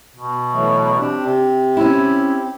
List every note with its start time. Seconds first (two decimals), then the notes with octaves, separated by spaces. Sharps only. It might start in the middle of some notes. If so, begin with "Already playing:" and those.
0.16 B2
0.53 E3 F#3 A3
1.00 C4 D4 G4
1.25 C3
1.77 C#4 E4